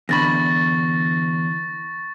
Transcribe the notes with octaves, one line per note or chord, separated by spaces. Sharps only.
E2 D3 B5 C#6 A6 A#6